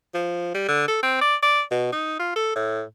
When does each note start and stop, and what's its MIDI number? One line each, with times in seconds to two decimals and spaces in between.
0.15 0.54 53
0.55 0.65 55
0.68 0.84 50
0.88 1.01 69
1.03 1.16 60
1.22 1.36 74
1.43 1.61 74
1.71 1.89 47
1.93 2.17 63
2.20 2.32 65
2.36 2.51 69
2.56 2.83 45